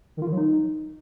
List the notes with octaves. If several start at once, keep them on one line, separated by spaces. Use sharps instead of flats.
D#3
F4
D#3
F#3
D#4